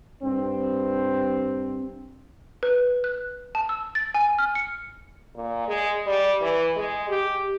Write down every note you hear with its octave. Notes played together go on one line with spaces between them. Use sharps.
G2 C4
B4
F#6
A5
E6
A6
G#5
F6
C#7
A#2
G#3
G3
E3
G#3
G4